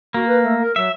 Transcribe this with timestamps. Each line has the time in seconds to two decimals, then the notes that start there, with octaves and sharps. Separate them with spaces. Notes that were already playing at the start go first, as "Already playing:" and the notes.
0.14 A#3 F#4
0.26 B4
0.43 A3
0.60 A#4
0.76 F#3 E5